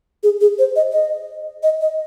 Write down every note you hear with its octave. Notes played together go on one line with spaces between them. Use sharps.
G#4
G#4
C5
D#5
D#5
D#5
D#5